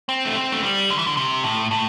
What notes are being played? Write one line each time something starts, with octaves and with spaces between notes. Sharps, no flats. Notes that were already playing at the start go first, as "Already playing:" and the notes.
C4
A3
C4
A3
G3
D3
E3
D3
C3
A2
A2